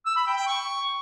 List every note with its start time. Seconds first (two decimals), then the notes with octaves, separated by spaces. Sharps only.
0.06 E6
0.16 B5
0.27 G5
0.37 G5
0.47 C#6